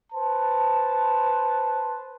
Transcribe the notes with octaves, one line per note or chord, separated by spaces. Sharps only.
B4 C5 A5